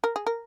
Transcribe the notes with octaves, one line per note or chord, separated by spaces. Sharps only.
A#4
G#4
A#4